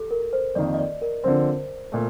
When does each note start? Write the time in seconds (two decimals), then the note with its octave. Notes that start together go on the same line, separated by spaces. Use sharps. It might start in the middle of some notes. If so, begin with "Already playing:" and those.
Already playing: G4 A4
0.11 A#4
0.33 C5
0.55 F2 D#3 A#3 D5
0.74 D#5
0.79 D5
1.02 A#4
1.23 D3 F3 C4 C5
1.92 A#2 A3